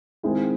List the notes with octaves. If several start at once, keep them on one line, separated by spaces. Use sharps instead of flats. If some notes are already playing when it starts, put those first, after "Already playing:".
D#3 G#3 C4 E4 G#4